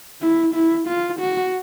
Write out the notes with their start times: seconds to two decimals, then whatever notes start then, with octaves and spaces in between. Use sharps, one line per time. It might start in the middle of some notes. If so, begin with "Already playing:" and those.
0.21 E4
0.54 E4
0.88 F4
1.20 F#4